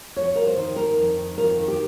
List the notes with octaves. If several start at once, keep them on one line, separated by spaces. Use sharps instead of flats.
F2 C#5
F2 A#4
C5
D#3
D#3 A#4
F2
D#3
F2 A#4
D#3
G4